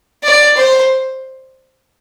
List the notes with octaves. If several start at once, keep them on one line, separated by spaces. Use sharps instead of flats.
D5
C5